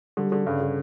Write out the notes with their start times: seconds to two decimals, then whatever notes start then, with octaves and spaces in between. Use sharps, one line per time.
0.17 D3 G3
0.32 D3
0.46 G2 C#3
0.61 D3